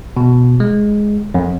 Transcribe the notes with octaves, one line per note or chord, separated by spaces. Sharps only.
B2
G#3
F2